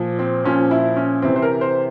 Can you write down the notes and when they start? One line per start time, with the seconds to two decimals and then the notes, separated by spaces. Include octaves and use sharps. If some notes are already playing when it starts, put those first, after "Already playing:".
Already playing: A#2 F3
0.19 C4
0.44 A#2 F3 C#4
0.71 E4
0.96 C#4
1.22 C3 E3 C4
1.36 C5
1.42 A#4
1.61 C5